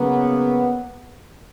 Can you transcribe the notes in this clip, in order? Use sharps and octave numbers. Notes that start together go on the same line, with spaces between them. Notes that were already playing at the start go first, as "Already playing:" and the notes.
Already playing: C#3 F#3 A#3 B3